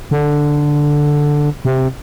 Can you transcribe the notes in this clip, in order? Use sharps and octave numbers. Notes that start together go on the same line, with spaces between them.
D3
C3